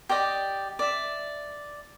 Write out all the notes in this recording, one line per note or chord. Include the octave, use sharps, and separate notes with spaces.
G4 D5 D#5 D#6
D5 E5